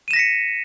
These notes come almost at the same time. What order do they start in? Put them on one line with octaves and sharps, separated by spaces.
D#7 E7 A#6 B6 C#7